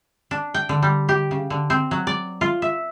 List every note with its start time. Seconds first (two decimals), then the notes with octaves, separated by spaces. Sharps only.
0.31 D4
0.54 G5
0.69 D3
0.83 G3
1.09 G4
1.31 C#3
1.50 D3
1.70 C4
1.91 F#3
2.07 D5
2.41 F4
2.62 E5